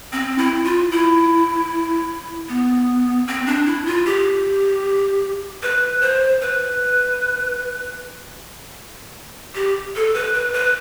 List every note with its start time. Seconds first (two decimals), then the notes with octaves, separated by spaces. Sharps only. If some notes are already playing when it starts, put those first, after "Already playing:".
0.13 C4
0.38 E4
0.64 F4
0.91 E4
2.49 B3
3.28 C4
3.46 D4
3.66 E4
3.86 F4
4.06 G4
5.62 B4
6.01 C5
6.41 B4
9.55 G4
9.95 A4
10.14 B4
10.34 B4
10.53 B4